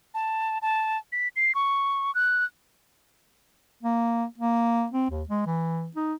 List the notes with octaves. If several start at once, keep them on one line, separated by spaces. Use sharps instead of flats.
A5
A5
B6
C7
C#6
F#6
A#3
A#3
C4
D#2
G#3
E3
D#4